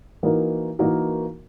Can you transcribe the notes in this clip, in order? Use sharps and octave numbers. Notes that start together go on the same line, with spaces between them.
E3 A#3 D#4 F#4 A#4
E3 A#3 D#4 F#4 A#4